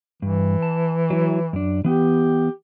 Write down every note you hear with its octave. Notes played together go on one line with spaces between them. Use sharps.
G2 E3
A5
F#3 E4
F#2 D4
E3 B3 G4 G5